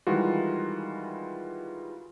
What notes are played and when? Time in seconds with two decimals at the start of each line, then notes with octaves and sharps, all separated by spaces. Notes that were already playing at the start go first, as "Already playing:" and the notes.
0.07 D#3 E3 G3 G#3 F4 F#4